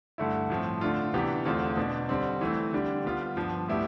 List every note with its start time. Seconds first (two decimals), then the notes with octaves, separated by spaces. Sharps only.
0.18 G2 D3 A3 E4
0.50 A2 F3 C4
0.81 D3 A3 D4 F4
1.14 C3 E3 B3 D4 G4
1.45 E2 D3 A3 C4 F4
1.77 B2 B3 D4
2.09 D3 G3 C4
2.41 E3 A3 C4
2.73 D3 G3 D4 G4
3.05 D3 G3 B3 F4
3.37 G2 F3 B3
3.68 A2 G3 B3 E4 G4